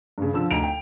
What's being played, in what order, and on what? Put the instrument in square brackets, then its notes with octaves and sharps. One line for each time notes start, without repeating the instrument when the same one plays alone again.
[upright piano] G2 C#3
D3 F3 E6
D2 D#4 A#5 D7 F7
G5